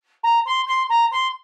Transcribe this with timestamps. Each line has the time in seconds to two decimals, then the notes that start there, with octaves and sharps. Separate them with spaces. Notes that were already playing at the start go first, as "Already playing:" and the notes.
0.23 A#5
0.45 C6
0.67 C6
0.89 A#5
1.11 C6